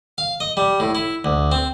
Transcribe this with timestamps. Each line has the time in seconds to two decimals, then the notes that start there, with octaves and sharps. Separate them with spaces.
0.18 F5
0.40 D#5
0.57 G3
0.80 A2
0.95 E4
1.25 D2
1.52 C4